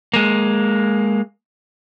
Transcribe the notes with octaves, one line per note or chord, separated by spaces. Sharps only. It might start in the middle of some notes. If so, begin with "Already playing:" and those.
G#3 A#3